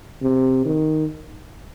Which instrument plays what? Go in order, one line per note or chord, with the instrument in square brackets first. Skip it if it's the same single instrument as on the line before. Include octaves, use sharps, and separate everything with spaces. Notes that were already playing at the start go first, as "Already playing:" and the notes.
[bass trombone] C3
D#3